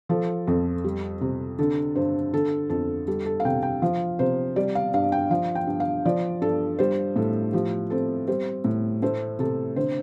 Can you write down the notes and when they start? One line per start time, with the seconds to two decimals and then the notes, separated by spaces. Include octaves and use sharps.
0.09 F3 A4
0.47 F2 A4
0.84 G3
1.21 C3
1.59 D3 A4
1.96 G2 C5
2.33 D3 A4
2.70 F2 A4
3.07 G3 A4
3.25 A4
3.40 F5
3.45 C3 G5
3.63 G5
3.82 F3 F5
4.19 C3 C5
4.56 G3 D5
4.75 F5
4.94 G2 F5
5.12 G5
5.30 F3 F5
5.55 G5
5.67 G2
5.80 F5
6.05 F3 D5
6.41 G2 A4
6.79 G3 C5
7.16 A2 A4
7.53 F3 G4
7.90 C4 A4
8.28 G3 C5
8.65 A2
9.02 A3 C5
9.39 C3 A4
9.76 D3 C5